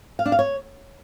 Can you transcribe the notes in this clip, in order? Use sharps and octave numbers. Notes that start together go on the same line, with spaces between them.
F5
D4
F5
C#5